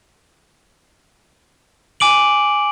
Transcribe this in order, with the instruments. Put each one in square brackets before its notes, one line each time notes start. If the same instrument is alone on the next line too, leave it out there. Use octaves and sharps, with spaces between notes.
[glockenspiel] G#5 D6 D7 F#7